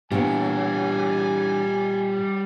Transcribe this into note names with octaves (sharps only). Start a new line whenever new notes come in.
A#2 E3 G3 B3 D4 G4 C#5 G#5